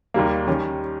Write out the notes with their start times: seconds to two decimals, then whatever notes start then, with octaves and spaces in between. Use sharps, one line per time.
0.14 D#2 D#3 G3 A#3
0.47 D#3 G3 C#4